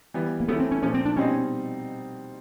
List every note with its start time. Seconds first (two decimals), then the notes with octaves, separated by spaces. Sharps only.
0.14 E3 G3 B3
0.40 A#3
0.48 E3 A3 B3 C#4 E4
0.60 C4
0.71 C#4
0.82 A#2 F3 A3 C#4
0.94 C4
1.05 D4
1.16 B2 G3 C4 C#4 D#4